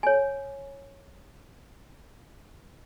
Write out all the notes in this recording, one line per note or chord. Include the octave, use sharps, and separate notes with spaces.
C#5 G#5